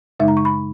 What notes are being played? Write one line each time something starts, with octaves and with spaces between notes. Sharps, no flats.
F#2 C#3 G#3 D#4 E5
A#5
C#6
B5